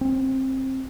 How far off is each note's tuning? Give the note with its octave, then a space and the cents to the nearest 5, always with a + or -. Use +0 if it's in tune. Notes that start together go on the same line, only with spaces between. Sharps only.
C4 +20